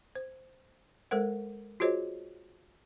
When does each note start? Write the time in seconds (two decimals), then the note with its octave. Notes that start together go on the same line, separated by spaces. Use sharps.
0.15 C5
1.11 G#3 A4 A#4 C5 F#5
1.80 F4 F#4 G#4 C5 C#5 D#5